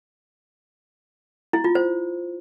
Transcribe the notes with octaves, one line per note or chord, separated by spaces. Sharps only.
E4
F4
C5